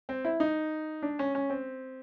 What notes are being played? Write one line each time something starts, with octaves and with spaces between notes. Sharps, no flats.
C4
E4
D#4
D4
C#4
C#4
C4